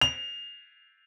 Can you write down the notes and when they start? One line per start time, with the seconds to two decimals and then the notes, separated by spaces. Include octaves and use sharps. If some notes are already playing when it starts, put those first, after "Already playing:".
0.01 F7